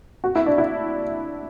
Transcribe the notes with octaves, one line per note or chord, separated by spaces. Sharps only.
F#4
E4
D4
E4